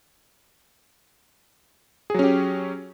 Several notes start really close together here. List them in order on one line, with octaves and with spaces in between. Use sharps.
G#4 F#3 C#4 G4